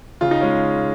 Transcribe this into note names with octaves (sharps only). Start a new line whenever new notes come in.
C#3 F4
D#4
G#3 C#4